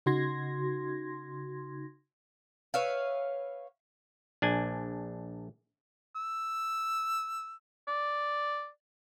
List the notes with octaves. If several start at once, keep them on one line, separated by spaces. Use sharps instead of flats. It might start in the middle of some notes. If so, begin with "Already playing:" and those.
C#3 D#4 F#4 C6 G#6 A#6
B4 C#5 E5 F5
A#1 D4 G#5
E6
D5